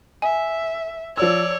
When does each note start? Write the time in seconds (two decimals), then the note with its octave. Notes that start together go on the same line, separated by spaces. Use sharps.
0.22 E5 G#5
1.17 F3 C#5 D5 E6